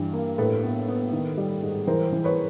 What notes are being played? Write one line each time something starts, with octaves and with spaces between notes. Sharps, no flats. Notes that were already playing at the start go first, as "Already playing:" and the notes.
Already playing: G2 E3 G3
A#3
A2 A4 B4
B3
B3
D#3
G3
G#2
E3 A#4 C5
E3
B4 C#5